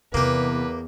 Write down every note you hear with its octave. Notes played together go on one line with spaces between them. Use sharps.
E2 C3 A#3 G4 B4